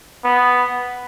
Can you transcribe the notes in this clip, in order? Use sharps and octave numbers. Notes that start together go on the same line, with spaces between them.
B3